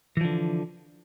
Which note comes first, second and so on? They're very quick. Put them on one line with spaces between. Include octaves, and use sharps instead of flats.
E3 F3 D3